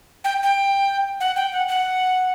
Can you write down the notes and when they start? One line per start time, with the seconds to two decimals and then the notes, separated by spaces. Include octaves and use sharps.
0.24 G5
0.43 G5
1.20 F#5
1.36 G5
1.52 F#5
1.68 F#5